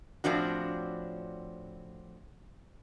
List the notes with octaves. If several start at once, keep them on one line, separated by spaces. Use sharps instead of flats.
A2 F3 C4 D4 F#4